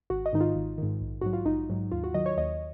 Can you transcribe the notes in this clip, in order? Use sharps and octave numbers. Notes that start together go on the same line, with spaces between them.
G#1 F#4
D#5
G#2 D#3 D#4
F4
G#1
G#2 D#3
A#1
G#2 F#3 F#4
F4
A#1 D#4
G#2 F#3
D#2 F4
F#4
D#3 F#3 D#5
C#5
D#2 D#5